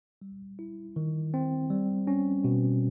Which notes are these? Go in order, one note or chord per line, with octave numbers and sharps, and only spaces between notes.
G3
E4
D#3
C4
G3
C#4
B2